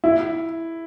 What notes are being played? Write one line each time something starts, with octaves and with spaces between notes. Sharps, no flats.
E4